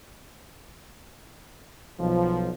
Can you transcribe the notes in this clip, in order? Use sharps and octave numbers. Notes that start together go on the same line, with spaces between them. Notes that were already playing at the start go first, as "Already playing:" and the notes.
B1 F3